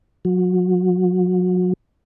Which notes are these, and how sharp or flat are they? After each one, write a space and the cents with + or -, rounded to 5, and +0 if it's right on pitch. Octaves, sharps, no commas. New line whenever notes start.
F#3 -30